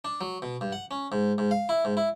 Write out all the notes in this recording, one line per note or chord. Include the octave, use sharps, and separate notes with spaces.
D4
F#3
B2
G2
F#5
C#4
G#2
G#2
F5
E4
G#2
E4